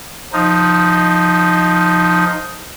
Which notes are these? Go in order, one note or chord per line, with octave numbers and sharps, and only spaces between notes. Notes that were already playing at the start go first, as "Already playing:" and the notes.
F3 D#4